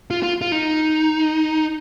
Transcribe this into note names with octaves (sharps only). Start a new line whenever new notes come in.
F4
F4
F4
D#4